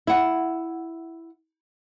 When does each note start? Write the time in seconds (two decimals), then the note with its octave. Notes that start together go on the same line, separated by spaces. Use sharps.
0.07 E4 F#5